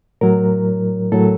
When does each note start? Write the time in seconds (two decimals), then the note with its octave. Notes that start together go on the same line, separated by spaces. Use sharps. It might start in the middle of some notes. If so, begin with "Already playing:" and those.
0.21 A2 F#3 A#4
1.12 A2 F#3 A4